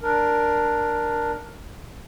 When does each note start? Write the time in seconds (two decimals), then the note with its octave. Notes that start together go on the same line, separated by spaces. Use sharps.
0.01 D4 A#4